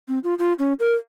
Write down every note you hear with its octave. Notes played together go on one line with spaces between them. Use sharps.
C4
F4
F4
C#4
A#4